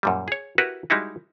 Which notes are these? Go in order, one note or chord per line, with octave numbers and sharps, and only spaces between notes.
F#2 A#2 G3
G#4 C#5
E4 F#4 G4 A#4 B4
G3 G#3 D#4 E4 F#4